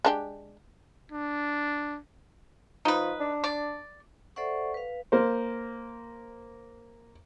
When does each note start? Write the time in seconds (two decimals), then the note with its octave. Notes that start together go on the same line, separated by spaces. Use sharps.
0.05 G#3 D4 G4
1.12 D4
2.85 F3 D#4 B4
3.20 D4
3.44 D5
4.36 A4 C5 D5 E5 F#5 C#6
4.74 B4 F5
5.12 A#3 C5